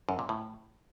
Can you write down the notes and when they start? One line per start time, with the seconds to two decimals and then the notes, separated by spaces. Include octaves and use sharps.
0.09 F#2
0.19 A#2
0.29 A2